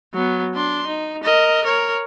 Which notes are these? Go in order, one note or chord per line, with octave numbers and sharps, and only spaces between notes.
F#3 B3
D4 C6
D#4
A#4 D#5
A#4 C#5